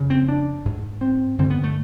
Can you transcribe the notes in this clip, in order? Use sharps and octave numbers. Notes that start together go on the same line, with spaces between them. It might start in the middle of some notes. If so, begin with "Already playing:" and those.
Already playing: F2 C#3
C4
D4
G#2
C4
G2 D3 C4
B3
A3